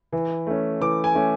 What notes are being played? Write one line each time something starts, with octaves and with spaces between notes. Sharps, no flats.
E3
A3 C#4
E3 D6
G#5
A3 C#4